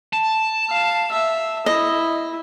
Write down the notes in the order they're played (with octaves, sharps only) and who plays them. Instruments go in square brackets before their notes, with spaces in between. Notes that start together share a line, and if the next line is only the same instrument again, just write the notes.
[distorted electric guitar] A5
[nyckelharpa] F5
E5
[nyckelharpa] E4 [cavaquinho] D#5